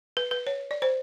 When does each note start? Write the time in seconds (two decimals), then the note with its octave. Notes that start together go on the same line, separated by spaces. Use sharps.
0.17 B4
0.31 B4
0.47 C#5
0.71 D5
0.82 C5